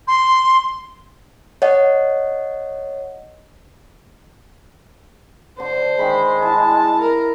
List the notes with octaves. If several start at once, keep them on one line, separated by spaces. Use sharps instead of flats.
C6
C#5 D#5 F#5
D3 C5
D#3 G#3 B5
E4 A5
A#4